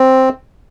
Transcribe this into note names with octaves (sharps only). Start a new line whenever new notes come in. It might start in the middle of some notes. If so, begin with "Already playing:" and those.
Already playing: C4